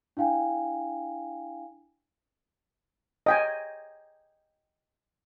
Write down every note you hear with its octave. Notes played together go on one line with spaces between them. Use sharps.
D4 E4 F5 G5 G#5
D#5 G5 G#5